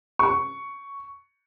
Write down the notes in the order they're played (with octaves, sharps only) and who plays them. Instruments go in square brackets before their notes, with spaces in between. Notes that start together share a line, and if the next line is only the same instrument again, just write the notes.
[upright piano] C#6